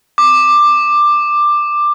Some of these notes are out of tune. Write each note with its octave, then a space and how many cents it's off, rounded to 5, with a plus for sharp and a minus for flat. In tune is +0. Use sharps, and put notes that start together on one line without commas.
D6 +15